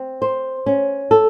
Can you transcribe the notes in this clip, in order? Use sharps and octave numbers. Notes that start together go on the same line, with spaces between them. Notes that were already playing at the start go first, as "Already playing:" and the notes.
Already playing: C4
C5
C#4
A4